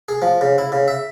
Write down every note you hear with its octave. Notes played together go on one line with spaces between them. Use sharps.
G#4
F3
C#3
E4
C#3
E5